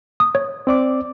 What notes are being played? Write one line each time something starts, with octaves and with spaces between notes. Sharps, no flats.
D#6
C#5
C4 D5 D6